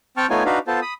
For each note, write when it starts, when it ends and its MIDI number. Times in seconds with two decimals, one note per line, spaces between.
0.17 0.27 60
0.17 0.27 79
0.17 0.27 81
0.17 0.27 85
0.17 0.27 89
0.30 0.43 57
0.30 0.43 59
0.30 0.43 63
0.30 0.43 65
0.30 0.43 73
0.30 0.43 80
0.45 0.59 62
0.45 0.59 63
0.45 0.59 66
0.45 0.59 71
0.45 0.59 77
0.67 0.80 59
0.67 0.80 65
0.67 0.80 69
0.67 0.80 72
0.67 0.80 81
0.82 0.94 83
0.82 0.94 87